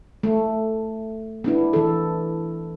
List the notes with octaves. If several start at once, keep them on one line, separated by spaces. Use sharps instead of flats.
A3
B3 D4 E4
E3 A4